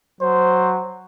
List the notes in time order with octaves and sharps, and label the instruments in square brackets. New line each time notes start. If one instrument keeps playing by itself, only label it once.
[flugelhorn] F#3 [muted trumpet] C5